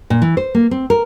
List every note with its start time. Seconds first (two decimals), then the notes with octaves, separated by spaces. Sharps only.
0.10 A#2
0.22 E3
0.37 C5
0.55 A#3
0.71 C4
0.90 A#4